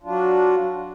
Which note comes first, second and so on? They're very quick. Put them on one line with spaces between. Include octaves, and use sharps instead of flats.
F4 D4 F#3 F#4